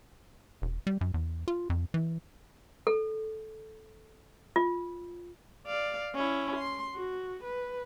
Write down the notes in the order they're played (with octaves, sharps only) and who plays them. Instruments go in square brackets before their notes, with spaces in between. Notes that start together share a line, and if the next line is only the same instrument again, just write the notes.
[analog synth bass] E1
G3
F#2
E2
F4
F2
E3
[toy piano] A4
F4
[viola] D5 F5
C#4 E4
C6
F#4
B4